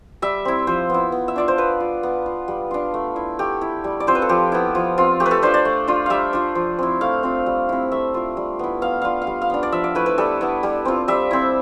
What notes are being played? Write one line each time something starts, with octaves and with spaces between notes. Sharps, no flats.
G3 E5
C4 E4
F3 C5
B3 E4
B3
E5
D4 F4 D5
C5
B3 B4
F4
B3
F4
G3
D4 F4
A3
E4
A3 G4
E4
G3
D5
C4 F4 C5
B4
A4
F3 G4
B3 E4
F3
C4 F4
A3 G4
B4
A4
D4 F4 C5
D5
A3
D4 F4
G3 E5 F5
D4 F4
F3
C4 E4
A3 F5
C4 F4
G3
C4 E4
A3 E5
D4 F4
G3
B3 E4
B3 F5
D4 F4 F5
F5
G3
F5
B3 D4
D5
F3 E5
D5
A3 E4 B4
B4
G3 A4
B3 E4
G3
C4 F4
G3 E5
C4 E4